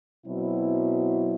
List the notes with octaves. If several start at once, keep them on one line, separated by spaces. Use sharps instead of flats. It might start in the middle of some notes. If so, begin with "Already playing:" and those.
B2 F#3 C4 E4